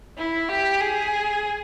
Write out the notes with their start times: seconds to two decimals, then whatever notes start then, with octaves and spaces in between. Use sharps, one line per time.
0.17 E4
0.49 G4
0.81 G#4